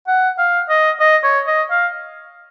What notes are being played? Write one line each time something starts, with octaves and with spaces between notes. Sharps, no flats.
F#5
F5
D#5
D#5
C#5
D#5
F5